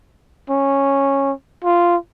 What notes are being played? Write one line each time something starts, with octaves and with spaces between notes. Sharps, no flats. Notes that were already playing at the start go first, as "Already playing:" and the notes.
C#4
F4